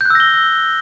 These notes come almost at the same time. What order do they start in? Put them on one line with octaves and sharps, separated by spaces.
G6 F#6 E6 A#6 G7